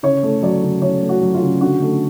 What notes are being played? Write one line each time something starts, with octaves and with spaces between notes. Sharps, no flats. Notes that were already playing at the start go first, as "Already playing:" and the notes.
C#3 C#5
A3
F#3 D5
C#3
C#3 C#5
A3
F#4
F#3
F4
C#3
D3 F#4
A3